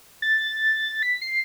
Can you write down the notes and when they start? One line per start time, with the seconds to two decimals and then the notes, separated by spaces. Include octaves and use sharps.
0.22 A6
1.03 B6
1.21 C7